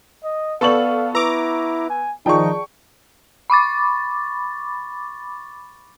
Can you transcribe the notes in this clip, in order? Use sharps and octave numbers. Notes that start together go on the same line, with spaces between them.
D#5
B3 A4 B4 D5 F5 C#6 F#7
E4 B4 A#5 D6 E6
G#5
D#3 F3 D#4 G#4 D5 G5 A5 C#6
B5 C#6 D6 A6